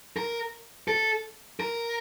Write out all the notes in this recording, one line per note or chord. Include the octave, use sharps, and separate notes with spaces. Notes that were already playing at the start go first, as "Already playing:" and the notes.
A#4
A4
A#4